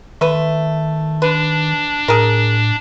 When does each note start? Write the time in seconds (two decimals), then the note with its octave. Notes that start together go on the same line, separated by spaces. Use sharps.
0.21 D#3 A3 B4
1.22 D4 B4
2.08 A2 G#4 A#4